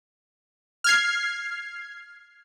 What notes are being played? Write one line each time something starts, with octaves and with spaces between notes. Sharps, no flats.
F6 G#6 C7